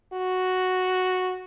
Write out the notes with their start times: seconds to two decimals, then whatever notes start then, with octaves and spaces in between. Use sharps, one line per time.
0.13 F#4